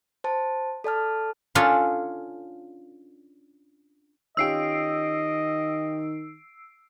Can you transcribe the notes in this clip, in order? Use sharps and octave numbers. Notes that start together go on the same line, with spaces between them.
C5 A5
A4 D5 A5 F6
C#4 D4 F4 A4
D#3 C#4 F4 G4 D#5 E6 C7 D7